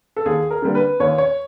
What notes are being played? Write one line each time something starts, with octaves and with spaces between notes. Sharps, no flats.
A4
D#2 G#4
A#4
D3 G3 A#3
B4
D#2 C#5
C#5